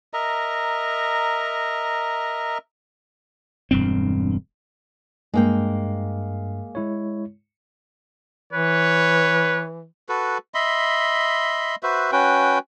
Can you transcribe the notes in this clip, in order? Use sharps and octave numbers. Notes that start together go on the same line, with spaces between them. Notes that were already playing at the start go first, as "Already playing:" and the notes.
A#4 D#5 E5 A#5
E1 G2 C4
G2 G#3 A#3 G5
G#3 E4 C#5
E3 B4 C#5
F#4 A4 B4
D#5 E5 B5 C6
F#4 B4 C5 E5
C#4 F#4 B4 G5